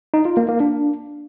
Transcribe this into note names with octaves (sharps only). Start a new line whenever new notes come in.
D#4
F4
A#3
A#3
D4